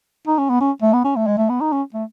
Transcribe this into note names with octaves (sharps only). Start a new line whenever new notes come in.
D#4
C#4
B3
C#4
A3
B3
C#4
A3
G#3
A3
B3
D#4
C#4
A3